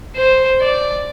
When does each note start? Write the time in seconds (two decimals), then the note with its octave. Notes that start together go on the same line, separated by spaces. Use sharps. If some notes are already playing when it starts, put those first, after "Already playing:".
0.16 C5
0.61 D5